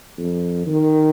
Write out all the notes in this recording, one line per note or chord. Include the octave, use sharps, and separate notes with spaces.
F2
D#3